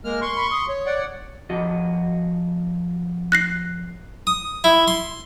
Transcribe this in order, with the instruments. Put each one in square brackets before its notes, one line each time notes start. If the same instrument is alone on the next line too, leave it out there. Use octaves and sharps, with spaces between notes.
[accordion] G#3 A#3 F6 [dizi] A#4
[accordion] C6 C#6
[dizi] B5
D#6
C#5
[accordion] D5 F#5
[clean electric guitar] F2 F#4 D#5
[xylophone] F#6 A#6 C7
[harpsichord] D#6
E4
C6